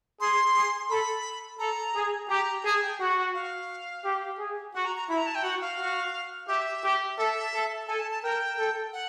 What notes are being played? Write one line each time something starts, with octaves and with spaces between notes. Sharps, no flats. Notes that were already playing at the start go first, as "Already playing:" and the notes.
G#4 C6
G#4
A4 B5
A4 A#5
G#4
G4 A#5
G#4 A5
G5
F#4 F#5
F5
G4
G#4
F#4 F#5
A#5
A#5
E4 B5
A#5
A5
G5
F#4 F#5
F5
F#4
G4 E5
G4
A4 E5
A4
A4 G#5
A5
A5
A#4 G5
A4
F#5